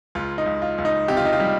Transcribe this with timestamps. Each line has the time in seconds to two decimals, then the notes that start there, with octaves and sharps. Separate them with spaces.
0.15 C#2 F4
0.38 D#4
0.46 C#2
0.62 F4
0.78 C#2
0.85 D#4
1.08 C3 G4
1.17 F4
1.25 D#4
1.33 F4
1.40 G3